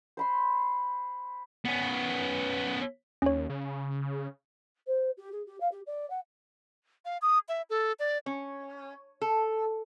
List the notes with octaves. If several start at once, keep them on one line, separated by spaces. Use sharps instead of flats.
C5 B5 C6
B3 C#4
D#2 C#4 C#5
C#3
C5
G4
G#4
G4
F5
G4
D5
F#5
F5
D#6
E5
A4
D5
C#4
A4